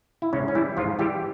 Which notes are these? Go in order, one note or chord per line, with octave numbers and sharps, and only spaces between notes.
E4
G#2 C#3 C#4
C#4
E3 G3 E4
G#2 F3 F4
E3 G3 G4